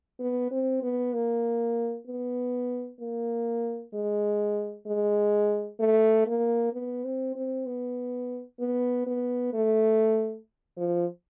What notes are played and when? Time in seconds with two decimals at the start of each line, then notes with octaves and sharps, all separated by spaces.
0.20 B3
0.51 C4
0.82 B3
1.13 A#3
2.07 B3
3.00 A#3
3.94 G#3
4.87 G#3
5.80 A3
6.26 A#3
6.73 B3
7.05 C4
7.36 C4
7.66 B3
8.60 B3
9.07 B3
9.53 A3
10.77 F3